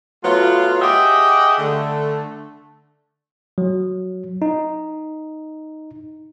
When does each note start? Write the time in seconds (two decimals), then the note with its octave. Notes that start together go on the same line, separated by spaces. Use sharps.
0.24 F#3 A3 B3 F4
0.81 G4 G#4 D#5 E5 F#5 G5
1.58 D3 A3
3.58 F#3
4.42 D#4